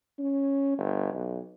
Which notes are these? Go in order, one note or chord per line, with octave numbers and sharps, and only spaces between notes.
C#4
G1
B1